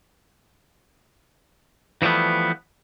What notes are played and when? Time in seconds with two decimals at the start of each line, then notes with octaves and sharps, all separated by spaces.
2.02 E3 F3 G3 A3 B3